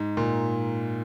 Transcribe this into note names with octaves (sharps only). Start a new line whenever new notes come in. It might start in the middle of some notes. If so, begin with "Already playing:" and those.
Already playing: G#2
A#2